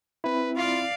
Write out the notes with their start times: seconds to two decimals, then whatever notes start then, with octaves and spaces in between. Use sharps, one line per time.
0.24 C4 E4 B4
0.57 F4 D5 F5